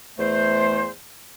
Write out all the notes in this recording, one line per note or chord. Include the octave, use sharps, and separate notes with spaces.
E2 A3 C5